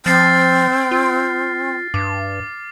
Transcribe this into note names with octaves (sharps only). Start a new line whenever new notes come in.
F3 C4 F6 A6 C7
F4
G2 D6